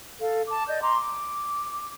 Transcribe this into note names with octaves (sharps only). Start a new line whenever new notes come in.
A4 F5
A5 D6
D5 D#5 G6
A#5 C6 D6
D6